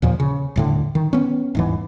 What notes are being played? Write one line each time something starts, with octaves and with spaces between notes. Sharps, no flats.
D#2 A#2 F3
C#3
D#1 A2 D3
D#3
B3 C#4
D#1 G#2 E3